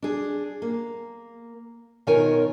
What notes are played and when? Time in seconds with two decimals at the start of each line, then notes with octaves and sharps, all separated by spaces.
0.02 D4 G#4
0.62 A#3
2.07 B2 D#3 F4 A#4 C#5 G#5